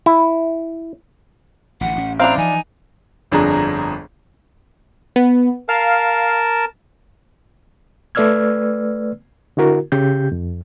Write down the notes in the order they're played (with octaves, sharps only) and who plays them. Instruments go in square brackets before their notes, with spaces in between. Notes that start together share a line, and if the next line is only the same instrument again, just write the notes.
[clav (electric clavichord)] E4
[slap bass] A1 D3 [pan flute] F#5
[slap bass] A1 C#4
[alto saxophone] C4 [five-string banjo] D4 E4 F5 [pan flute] A#5
[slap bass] E3 F3 [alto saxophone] D#4 [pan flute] G#5
[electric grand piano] G1 F2 D4 G#4 A#5
[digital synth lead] B3
[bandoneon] A#4 A5 [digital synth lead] F5
[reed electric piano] A3 B4 D5 E6 F6 G#6
D3 E4 F#4 A#4
C#3 G4 G6
F2